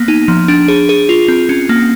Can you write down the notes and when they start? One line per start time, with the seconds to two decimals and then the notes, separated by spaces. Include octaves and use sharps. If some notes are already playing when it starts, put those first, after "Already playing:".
Already playing: A#3 B3
0.08 D#4
0.28 F3
0.48 D4
0.68 G#4
0.89 G#4
1.09 F4
1.28 C4
1.49 C#4
1.69 A#3